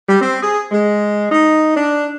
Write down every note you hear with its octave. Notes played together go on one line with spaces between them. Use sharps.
G3
C4
G#4
G#3
D#4
D4